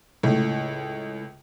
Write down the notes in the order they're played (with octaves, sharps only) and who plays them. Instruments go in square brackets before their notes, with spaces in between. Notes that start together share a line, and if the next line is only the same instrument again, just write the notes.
[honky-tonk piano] C#2 A2